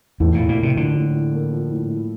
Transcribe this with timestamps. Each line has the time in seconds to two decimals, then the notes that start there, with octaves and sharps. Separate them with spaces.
0.20 E2 A2
0.34 A#2 E4
0.49 A#2
0.59 C3 A#3
0.76 D3 F3
0.95 A2
1.15 E4
1.34 A#3
1.53 F3
1.72 A2
1.90 E4